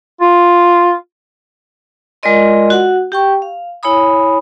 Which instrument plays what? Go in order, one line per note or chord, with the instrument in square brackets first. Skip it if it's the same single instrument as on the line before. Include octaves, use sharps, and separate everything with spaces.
[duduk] F4
[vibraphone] G#3 F4 A#4 D5 D#5 C6
F#4 F#5
G4 G5 C#6
F5
E4 C#5 G#5 B5 D#6